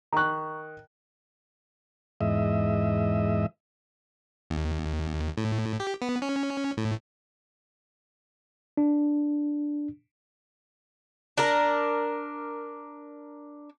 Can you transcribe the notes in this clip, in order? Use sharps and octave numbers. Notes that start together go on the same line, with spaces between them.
D#3 A#5 C#6 F#6
E2 G#2 D#5 E5
D#2
A2
G4
B3
C#4
A2
D4
D4 A#4